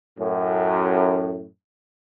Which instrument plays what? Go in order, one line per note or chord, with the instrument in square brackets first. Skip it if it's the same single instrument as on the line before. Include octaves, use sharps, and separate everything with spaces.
[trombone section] F#2 A2